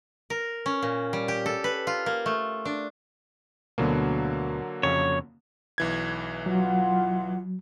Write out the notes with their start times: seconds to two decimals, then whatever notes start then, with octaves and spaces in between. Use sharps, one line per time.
0.30 A#4
0.66 C#4
0.82 A#2
1.13 G3
1.28 G4
1.46 A4
1.64 B4
1.87 F4
2.06 A#3
2.26 A3
2.65 D4
3.78 D2 B2 D3 F#3 A#3
4.83 F2 C#3 C#5
5.78 B1 E3 G#6
6.46 F#3 F4 F#5